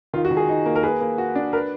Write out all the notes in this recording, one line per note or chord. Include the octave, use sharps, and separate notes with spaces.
D#3 F4
F#4
D#3
G#4
D#4
A#3
A#4
G#4 B4
A#3
F#4
D4
A#4 B4